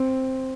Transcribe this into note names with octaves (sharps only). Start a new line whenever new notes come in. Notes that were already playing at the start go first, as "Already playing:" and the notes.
Already playing: C4